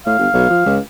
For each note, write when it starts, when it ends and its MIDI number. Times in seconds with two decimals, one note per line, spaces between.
0.06 0.18 45
0.06 0.78 77
0.19 0.28 31
0.34 0.46 35
0.50 0.61 53
0.66 0.79 37